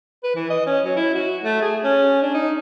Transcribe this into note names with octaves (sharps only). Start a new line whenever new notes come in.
B4
E3
D#5
C#4
F#3
E4
F#4
A3
G#4
C#4
D4
D#4